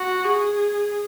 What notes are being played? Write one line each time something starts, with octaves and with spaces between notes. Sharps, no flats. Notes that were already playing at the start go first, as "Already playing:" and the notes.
Already playing: F#4
G#4